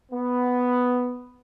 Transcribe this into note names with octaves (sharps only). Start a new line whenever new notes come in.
B3